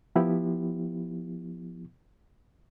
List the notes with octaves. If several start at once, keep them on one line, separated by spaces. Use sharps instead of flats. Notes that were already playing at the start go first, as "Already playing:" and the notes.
F3 B3 E4 G4